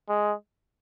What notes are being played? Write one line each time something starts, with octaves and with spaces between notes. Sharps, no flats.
G#3